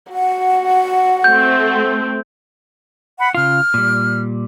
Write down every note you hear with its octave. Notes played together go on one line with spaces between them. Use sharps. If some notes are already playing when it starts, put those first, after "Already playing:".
F#4 F#5
A3 C4 G6
F#5 B5
C#3 F4 F6
A#2 G3